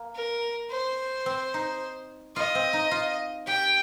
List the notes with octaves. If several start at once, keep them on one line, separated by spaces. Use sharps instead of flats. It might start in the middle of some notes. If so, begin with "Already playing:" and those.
Already playing: A#3
A#4
C5
C4
D#4
F4 D#5
C4
D#4
F4
G4 G5